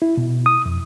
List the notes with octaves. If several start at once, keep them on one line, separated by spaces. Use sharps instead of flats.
E4
B2
D#6
F2